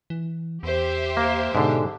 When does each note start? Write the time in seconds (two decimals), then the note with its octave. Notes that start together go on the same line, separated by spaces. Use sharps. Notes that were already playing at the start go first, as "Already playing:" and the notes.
0.10 E3
0.63 E2 G4 C5 E5
1.17 A#3
1.55 G#2 B2 D3